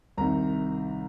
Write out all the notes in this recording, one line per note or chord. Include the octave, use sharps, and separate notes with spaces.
C2 C3 D#3 A#5